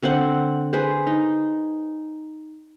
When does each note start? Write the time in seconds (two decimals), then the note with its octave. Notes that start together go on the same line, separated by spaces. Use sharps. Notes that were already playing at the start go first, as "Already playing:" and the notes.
0.03 D3 C4 C5 F#5
0.73 G#4 B4 C5
1.07 D#4